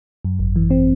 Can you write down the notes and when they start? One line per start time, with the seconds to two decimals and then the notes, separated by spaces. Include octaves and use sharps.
0.25 F#2
0.39 G#1
0.56 E3
0.70 C4